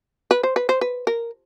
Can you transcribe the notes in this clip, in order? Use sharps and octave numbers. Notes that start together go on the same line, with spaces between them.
B4
C5
B4
C5
B4
A#4